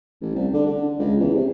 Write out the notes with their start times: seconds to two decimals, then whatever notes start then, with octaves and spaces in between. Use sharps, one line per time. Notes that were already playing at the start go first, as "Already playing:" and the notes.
0.22 A1
0.35 C2
0.54 D3
0.67 D3
0.99 C#2
1.20 E2
1.35 C3